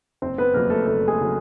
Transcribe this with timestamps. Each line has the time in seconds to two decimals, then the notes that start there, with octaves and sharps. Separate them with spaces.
0.22 F#1 C4 C5
0.38 B3 B4
0.54 F2 C#3 F#3 A#3 A#4
0.70 A3 A4
0.86 F#1 A3 A4
1.07 G#3 G#4
1.21 C#3 F#3